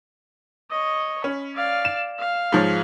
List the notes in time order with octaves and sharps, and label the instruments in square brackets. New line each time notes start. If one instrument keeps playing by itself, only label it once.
[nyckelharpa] C#5 D#5
[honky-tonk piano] C#4 [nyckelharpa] B5
[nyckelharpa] D5 F5
[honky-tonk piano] E7
[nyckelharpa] F5
[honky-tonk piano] G#2 F3 C#5